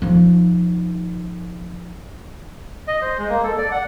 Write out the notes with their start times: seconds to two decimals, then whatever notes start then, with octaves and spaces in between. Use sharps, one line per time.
0.02 F3 D#4
2.88 D#5
3.02 C5
3.18 G#3
3.29 A#3
3.44 A4
3.58 D5
3.71 F#5